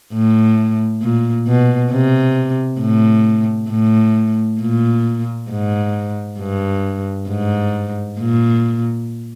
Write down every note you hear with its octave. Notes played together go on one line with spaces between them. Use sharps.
A2
A#2
B2
C3
A2
A2
A#2
G#2
G2
G#2
A#2